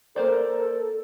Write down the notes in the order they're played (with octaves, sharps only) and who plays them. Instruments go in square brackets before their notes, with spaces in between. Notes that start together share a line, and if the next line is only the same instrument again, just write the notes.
[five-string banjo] A#3 C5 D5 [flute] A4 [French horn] A#4